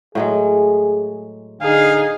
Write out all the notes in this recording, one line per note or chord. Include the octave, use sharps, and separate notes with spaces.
A2 F#3 G#3 G#4
D3 D#4 G#4 F5